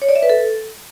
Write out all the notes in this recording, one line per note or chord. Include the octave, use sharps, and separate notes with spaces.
C#5
D5
E5
B4
A4